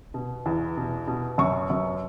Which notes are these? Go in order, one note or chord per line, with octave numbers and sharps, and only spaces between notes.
B2
E2
B2
B2
F#2 C#6
F#2